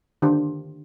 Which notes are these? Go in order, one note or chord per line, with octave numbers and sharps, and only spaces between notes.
D3 D#3 D4 F4 G4 C5